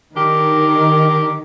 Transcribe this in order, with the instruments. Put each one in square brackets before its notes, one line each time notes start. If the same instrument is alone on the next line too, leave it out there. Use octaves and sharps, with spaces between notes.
[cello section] D#3 [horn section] D4 G4 A#4